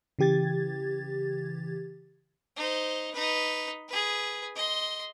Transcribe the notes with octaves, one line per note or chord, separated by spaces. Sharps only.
C#3 E3 G4 G#6 A6
D#4 C5
D#4 B4
G#4 B4
D#5 C6